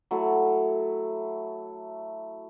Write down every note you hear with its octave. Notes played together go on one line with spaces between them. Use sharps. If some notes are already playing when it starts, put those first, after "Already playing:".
F#3 A3 E4